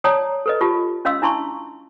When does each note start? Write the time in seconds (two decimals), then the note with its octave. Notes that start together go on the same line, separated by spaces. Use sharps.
0.04 C#5 D5 G5 A5 A#5 D#6
0.46 A4 B4 D#5
0.61 F4 G4 A5
1.05 C#4 D#5 F5 C6 E6
1.22 D4 E4 A5 C6 C#6